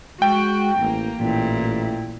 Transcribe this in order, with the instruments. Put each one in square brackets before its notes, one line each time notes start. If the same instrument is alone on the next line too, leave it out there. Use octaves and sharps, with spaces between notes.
[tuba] G#3 [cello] F#4 [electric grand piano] G5
[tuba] A1 [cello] A#3
[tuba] A1 [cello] A#2 E4